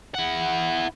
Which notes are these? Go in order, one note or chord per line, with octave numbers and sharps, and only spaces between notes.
E4 F#5